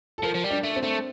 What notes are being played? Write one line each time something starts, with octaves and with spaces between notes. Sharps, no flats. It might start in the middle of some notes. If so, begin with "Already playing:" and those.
A4
F3 A#4
F3
G3
D4
A3
C4
A3